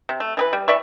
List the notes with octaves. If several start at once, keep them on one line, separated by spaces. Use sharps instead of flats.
C3
A3
E3 G#4 B4
G3
E3 D5 E5 C#6